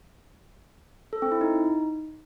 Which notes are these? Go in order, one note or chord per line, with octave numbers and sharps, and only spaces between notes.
A4
C4
E4
D#4